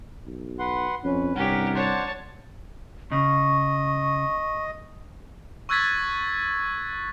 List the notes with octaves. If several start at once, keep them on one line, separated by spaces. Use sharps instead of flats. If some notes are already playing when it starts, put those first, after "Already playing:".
B1
B4 F#5 C6
F2 C#4 B4
C2 G2 C#4 G4 A#4 F#5
D4 C5 C#5 F#5 A5
C#3 D#5 C#6
C#6 E6 F#6 G#6 A6 B6